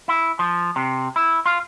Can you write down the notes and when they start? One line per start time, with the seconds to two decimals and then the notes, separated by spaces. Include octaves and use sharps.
0.08 E4
0.39 F3
0.76 C3
1.16 E4
1.46 F4